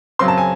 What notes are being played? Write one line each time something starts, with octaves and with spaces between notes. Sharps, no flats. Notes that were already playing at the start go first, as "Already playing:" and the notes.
F#2 C#3 F#3 C4 C6
A5
G#5